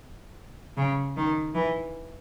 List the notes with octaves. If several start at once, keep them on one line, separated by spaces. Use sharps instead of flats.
C#3
D#3
E3